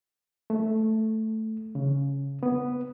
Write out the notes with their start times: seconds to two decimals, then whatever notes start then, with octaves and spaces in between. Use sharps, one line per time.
0.50 A3
1.75 C#3
2.43 B3